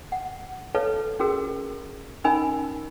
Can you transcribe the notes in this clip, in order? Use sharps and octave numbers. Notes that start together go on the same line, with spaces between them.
F#5
A4 B4 C#5 F5 A5
C#4 F#4 G#4 A#4
C#4 D#4 A#4 G#5 B5 E6